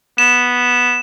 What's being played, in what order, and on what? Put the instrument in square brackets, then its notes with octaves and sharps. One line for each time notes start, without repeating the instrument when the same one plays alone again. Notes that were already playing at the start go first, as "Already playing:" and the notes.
[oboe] B3 [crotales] E7